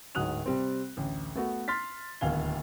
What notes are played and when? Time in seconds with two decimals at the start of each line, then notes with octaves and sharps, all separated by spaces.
0.15 D1 G#2 F#3 D#6 F#6 F7
0.46 C3 G3 C4
0.97 A1 D2
1.35 A3 B3 F#4
1.68 C6 F6 A6 B6
2.21 D1 D#2 B3 F5 G#5 G7